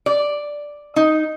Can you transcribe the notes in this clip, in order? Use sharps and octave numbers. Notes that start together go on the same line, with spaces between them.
D5
D#4